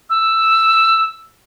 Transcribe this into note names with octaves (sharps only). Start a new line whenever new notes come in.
E6